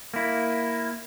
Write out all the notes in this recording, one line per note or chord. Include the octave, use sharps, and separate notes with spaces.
A#3 E4